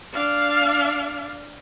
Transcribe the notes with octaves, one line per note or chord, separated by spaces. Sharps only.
D4 F5